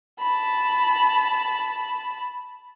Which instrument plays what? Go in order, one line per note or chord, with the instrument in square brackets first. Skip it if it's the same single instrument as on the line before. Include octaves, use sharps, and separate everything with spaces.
[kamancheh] A5 B5